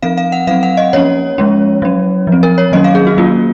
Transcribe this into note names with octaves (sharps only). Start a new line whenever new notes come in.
F3 C4 F5
F5
F#5
F#3 C4 F5
F#5
D#5
F3 A#3 C#4 C#5
F3 G#3 C#4
F#3 C#4
F3 C4
A#4
C#5
D#3 F#3 A#3 C#4 D#5
F5
G#4
F#4
F#3 A#3 C#4 F4